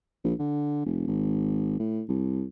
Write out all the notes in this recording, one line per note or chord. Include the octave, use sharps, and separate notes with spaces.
A#1
D3
F1
G#1
A2
C2